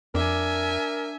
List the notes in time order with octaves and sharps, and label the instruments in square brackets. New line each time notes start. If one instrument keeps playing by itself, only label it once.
[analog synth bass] F2 [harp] D4 [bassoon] A#4 [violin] E5 G#5